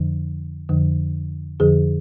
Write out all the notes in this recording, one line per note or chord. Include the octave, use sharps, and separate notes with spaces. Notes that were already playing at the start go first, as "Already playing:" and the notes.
Already playing: F2 D3 F3
F2 D3 F3
F2 D3 F3 G#4